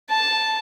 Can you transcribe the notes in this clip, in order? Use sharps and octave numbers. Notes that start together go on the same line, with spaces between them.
A5